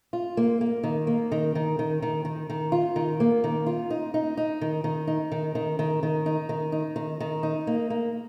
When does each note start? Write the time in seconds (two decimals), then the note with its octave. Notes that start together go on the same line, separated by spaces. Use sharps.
0.13 F4
0.37 A#3
0.61 A#3
0.84 D#3
1.07 A#3
1.32 D#3
1.55 D#3
1.79 D#3
2.02 D#3
2.25 D#3
2.50 D#3
2.72 F4
2.96 D#3
3.20 A#3
3.44 D#3
3.66 F4
3.90 D#4
4.14 D#4
4.37 D#4
4.61 D#3
4.84 D#3
5.07 D#4
5.32 D#3
5.55 D#3
5.79 D#3
6.03 D#3
6.26 D#4
6.49 D#3
6.72 D#4
6.96 D#3
7.20 D#3
7.43 D#4
7.67 A#3
7.90 A#3